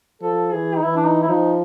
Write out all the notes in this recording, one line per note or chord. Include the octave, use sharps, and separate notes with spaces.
F3 A4
E3 G#4
D#4
E3 E4
D4
D#4
E4
F3 D#4